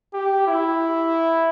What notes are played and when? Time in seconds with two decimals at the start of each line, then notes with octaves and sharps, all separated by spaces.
0.14 G4
0.47 E4